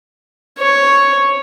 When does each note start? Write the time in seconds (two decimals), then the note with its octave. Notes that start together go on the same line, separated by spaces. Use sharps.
0.59 C#5